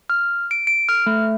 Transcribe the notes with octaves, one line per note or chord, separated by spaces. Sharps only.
F6
D7
D7
F6
A3